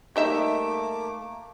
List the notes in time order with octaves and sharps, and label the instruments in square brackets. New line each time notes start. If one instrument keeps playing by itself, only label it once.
[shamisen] G3 D#4 E5 [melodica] A3 A#3 D6